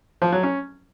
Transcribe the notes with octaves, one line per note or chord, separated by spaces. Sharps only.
F3
F#3
C#4